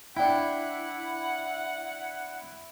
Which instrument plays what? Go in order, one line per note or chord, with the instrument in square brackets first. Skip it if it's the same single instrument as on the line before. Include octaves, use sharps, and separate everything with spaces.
[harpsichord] D4 G5 [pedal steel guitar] E4 [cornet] F#5